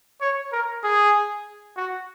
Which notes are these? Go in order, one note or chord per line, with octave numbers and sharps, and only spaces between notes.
C#5
A#4
G#4
F#4